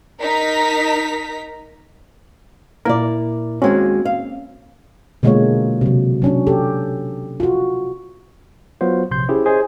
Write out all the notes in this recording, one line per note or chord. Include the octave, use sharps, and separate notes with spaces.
D#4 A#4 A#5 B6
A#2 A#3 E4 A#4 D5
D#2 G#3 A#3 C4 C#4 F#4
F5
B2 D3 G#3 A#3 F4 C#5
C3 F#3
F#3 C#4 D4
G4 A4
F4 F#4
F#3 B3 F4 C5
A#1 C3 C6 G6
C#4 E4 G4 G#4 C5
G#4 C5 C#5 D#5 G#5